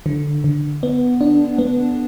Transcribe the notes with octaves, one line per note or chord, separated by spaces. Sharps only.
D3
D3
B3
D4
B3